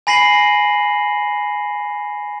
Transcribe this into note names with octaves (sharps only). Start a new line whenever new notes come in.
G#5 B5 A#6 C7 D#7 F#7